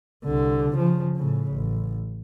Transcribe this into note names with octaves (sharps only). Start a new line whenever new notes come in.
C2 D3
C#3 F3
A2 C#3
A1